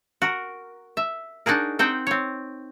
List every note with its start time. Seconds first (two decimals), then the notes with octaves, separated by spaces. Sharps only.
0.22 F#4 A#4
0.97 E5
1.46 D4 D#4 F#4 G#4 A#4
1.79 C4 D#4 C5 F#5 G5
2.07 C4 C#5